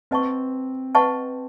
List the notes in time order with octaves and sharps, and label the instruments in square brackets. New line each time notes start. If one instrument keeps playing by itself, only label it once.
[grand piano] C4 [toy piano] B4 D#5 F#5 A5 C#6
[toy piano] B4 D#5 F#5 A5 C#6